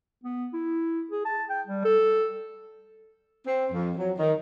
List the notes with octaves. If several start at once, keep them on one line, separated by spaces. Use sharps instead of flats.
B3
E4
G#4
A5
G5
G3
A4
C4
F2
F#3
D#3